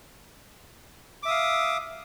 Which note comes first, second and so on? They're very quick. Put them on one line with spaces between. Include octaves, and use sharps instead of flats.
D6 E5 D#6 F5